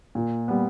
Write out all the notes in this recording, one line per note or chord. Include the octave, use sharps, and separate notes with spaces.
A#2
G3 B3